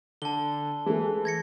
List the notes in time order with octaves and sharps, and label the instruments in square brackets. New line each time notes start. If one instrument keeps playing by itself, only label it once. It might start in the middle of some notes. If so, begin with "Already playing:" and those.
[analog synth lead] D3 [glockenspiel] A5 G7
[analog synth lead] E3 [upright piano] G#3 A3
[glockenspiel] G#6 A#6 C#7